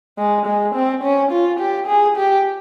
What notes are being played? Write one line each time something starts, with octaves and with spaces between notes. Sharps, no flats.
G#3
G#3
C4
C#4
F4
G4
G#4
G4